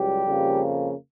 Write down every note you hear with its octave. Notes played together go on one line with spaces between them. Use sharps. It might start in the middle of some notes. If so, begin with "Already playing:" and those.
Already playing: C#2 F#3 G3 G4
F2 C#3 F3 A#3